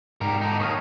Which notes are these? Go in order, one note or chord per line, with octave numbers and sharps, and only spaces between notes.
G#2 G3 A#4
D3 D#4
D#2 C#6 D#6 F6